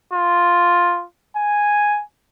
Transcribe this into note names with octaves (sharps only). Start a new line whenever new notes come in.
F4
G#5